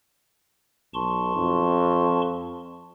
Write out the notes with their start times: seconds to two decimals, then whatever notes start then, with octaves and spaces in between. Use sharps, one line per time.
0.94 B1 A5 C6 C#6
1.36 F2